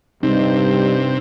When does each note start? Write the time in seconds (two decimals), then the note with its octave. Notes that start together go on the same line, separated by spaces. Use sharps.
0.23 G2 C3 G3 D#4